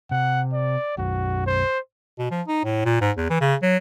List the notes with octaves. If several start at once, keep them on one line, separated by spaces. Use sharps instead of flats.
C3 F#5
D5
B1 F#2 F#4
C5
B2
F3
D#4
A2
A#2
G#2
E2
E3
C#3
F#3